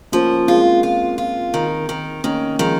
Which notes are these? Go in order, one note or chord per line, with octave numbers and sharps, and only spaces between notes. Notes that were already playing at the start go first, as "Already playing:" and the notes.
F3 A#3 C#4
G#3 C4 F4
F4
F4
D#3
D#3
D#3 A#3 C#4
D#3 F3 G#3